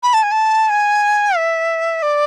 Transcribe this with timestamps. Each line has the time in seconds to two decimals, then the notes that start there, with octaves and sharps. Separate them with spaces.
0.03 B5
0.14 A5
0.23 G#5
0.32 A5
0.70 G#5
1.36 E5
2.02 D5